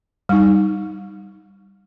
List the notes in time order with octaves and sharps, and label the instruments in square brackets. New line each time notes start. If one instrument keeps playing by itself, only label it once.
[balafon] G3 D#4